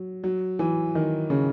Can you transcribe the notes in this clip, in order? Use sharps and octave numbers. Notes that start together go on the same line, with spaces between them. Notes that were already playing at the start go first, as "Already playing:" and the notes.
Already playing: F#3
F#3
E3
D#3
C#3